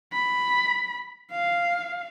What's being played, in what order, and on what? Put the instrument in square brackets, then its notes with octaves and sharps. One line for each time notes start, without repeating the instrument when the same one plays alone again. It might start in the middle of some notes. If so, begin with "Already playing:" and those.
[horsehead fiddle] B5
F5